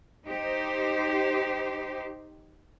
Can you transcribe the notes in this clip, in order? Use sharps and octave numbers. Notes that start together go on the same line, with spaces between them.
D#4 G4 C5